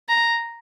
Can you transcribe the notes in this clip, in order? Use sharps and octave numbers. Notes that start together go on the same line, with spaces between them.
A#5